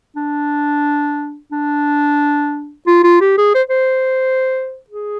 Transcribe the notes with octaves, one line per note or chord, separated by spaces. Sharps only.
D4
D4
F4
F4
G4
G#4
C5
C5
G#4